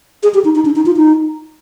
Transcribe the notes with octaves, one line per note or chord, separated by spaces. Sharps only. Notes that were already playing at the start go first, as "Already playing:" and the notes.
G#4
G4
D#4
D#4
D4
D#4
F4
D#4